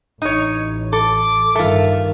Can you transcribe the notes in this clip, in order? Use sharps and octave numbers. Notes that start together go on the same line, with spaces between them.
A1 D#4 C#5
A4 D6
G2 D#3 F4 A4 E5